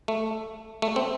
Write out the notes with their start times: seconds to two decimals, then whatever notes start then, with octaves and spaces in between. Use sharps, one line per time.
0.08 A3
0.82 A3
0.96 C4